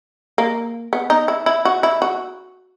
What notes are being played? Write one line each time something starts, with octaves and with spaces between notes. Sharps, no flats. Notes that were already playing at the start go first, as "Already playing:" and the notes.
A#3
B3
D#4
E4
E4
F#4
E4
F#4